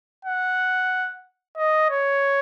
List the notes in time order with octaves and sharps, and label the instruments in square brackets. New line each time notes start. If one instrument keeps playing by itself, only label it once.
[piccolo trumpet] F#5
D#5
C#5